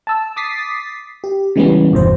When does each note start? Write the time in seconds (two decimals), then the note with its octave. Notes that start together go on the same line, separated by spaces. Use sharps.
0.07 A5 E6
0.36 D6 D#6 A6 B6 C7
1.24 G4
1.56 C#3 E3 G3 G#3 B3 C#4
1.92 G1 E2 B2 C5